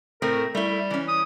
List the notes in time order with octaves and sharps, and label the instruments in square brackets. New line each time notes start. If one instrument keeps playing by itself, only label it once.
[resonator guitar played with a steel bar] A2 A3 C4 [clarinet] A#4
[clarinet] G3 [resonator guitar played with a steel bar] A3 E4
[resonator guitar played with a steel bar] E3 C#4
[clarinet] D#6